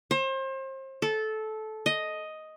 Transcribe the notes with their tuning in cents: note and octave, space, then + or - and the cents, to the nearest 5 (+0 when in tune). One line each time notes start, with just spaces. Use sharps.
C5 +35
A4 -15
D#5 +5